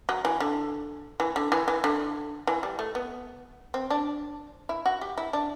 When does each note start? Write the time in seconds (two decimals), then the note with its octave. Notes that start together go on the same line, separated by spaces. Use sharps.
0.09 F#3
0.25 E3
0.40 D3
1.20 E3
1.36 D3
1.52 E3
1.68 E3
1.84 D3
2.47 E3
2.63 G3
2.79 A3
2.95 B3
3.74 C4
3.90 D4
4.69 E4
4.86 F#4
5.01 G4
5.18 E4
5.33 D4